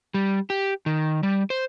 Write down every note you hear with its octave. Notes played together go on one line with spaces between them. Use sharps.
G3
G4
D#3
G3
C5